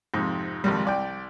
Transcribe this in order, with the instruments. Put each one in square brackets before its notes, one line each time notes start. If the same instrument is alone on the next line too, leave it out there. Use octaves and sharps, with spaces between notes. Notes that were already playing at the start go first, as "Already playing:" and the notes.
[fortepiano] F2 G#2 C3
G#1 F2 C3 G3
C2 D5 G5